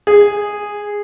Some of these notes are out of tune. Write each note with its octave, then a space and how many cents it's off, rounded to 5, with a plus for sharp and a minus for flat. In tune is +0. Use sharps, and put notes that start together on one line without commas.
G#4 -10